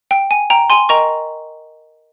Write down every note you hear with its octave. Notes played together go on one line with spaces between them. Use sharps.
G5
G#5
G5 A#5
G#5 C6
A#4 D#5 G5 A#5 C#6